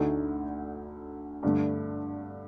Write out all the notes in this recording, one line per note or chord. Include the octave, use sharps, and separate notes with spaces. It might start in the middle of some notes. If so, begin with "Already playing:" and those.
Already playing: D2 D3 A3 D#4
G2 D3 A3